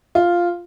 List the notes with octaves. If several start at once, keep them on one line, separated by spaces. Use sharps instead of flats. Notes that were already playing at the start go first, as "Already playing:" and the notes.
F4